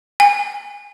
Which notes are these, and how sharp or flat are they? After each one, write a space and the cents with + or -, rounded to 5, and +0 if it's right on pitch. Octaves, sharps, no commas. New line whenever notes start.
G#5 -35